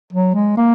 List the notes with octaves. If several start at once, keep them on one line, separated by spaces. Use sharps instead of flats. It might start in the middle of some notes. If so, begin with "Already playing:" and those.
F#3
G#3
A#3